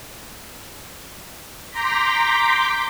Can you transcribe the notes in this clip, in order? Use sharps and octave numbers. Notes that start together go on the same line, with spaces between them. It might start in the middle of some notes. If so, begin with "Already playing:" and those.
A#5 C6 D6 G6 A#6 B6